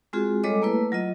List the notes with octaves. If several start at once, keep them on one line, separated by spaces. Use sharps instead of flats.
G#3 C4 F4 F#4 G#4
G3 G#3 A4 C#5 D#5 D6
A3 A#3 E4 B4
F#3 F4 D#5